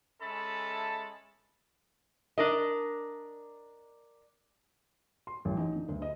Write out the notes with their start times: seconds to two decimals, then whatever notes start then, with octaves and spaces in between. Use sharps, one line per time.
0.22 G#3 C#4 A4 E5 A5 B5
2.38 D4 A#4 D#5
5.27 C6
5.45 A1
5.57 D#4
5.76 D3
5.89 D2
6.02 D#5